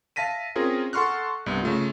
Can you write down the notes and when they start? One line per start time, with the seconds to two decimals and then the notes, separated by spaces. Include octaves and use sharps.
0.16 E5 F5 A5 A#6 B6 D#7
0.56 C4 C#4 F4 G#4 A#4
0.93 A4 F#5 C6 C#6 F6 F#6
1.46 C2 G2 B3
1.63 C#3 A3 F4